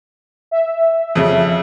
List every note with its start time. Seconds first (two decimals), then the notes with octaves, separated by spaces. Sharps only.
0.51 E5
1.15 F2 C#3